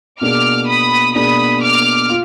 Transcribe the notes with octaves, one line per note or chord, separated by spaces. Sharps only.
B2 A#3 D4 G#4 D6 F6
B5 D#6
B2 A#3 D4 G#4 B5 D#6
D6 F6
F4